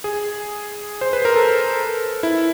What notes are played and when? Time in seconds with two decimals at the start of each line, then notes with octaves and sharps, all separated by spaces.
0.04 G#4
1.01 C5
1.13 B4
1.25 A#4
1.36 A4
2.23 E4